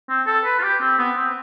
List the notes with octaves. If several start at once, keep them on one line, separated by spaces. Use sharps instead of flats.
C4
A4
B4
F4
G4
C4
B3
C4